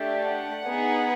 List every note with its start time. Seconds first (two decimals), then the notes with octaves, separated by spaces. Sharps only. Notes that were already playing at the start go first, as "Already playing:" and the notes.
Already playing: A3 D4 G4
0.26 F#5
0.67 B3 D#4 G#4